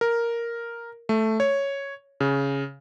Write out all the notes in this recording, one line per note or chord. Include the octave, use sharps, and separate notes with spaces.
A#4
A3
C#5
C#3